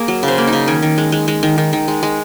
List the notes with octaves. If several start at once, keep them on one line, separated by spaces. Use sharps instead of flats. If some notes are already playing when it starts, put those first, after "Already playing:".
Already playing: A#3 G#4 A#4
F#3
C#3
C5
A#3
D#4
C#3
D#3 C#4
D#3
G#3
G#3
G#3
D#3
D#3
D#3
G#3
G#3